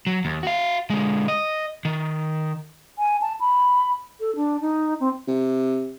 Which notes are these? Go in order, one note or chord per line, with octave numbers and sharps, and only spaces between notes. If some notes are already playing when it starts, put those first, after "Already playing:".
F#3
D#2
F#4 F5
D3 G#3
D#5
D#3
G#5
A5
B5
A4
D4
D#4
C4
C3